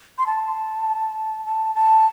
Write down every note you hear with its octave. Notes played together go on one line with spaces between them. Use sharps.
C6
A5
A5
A5